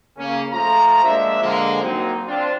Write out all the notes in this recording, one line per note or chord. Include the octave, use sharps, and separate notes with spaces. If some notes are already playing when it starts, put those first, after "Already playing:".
C#3 A#3 C#4
F3 A3 F4 F5 A#5
F3 G#3 A#3 D4 E5
D3 F3 G#3 A#3
F#3 A#3 C4 D#4
C4 D4 F4